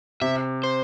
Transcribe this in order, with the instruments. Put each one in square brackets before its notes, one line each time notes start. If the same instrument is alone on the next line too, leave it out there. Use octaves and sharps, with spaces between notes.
[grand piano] C3 [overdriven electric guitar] E5
[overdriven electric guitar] C5